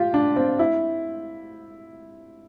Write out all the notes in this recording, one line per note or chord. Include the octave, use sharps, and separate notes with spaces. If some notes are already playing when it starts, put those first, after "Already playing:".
Already playing: F4 G4
D4
C4
E4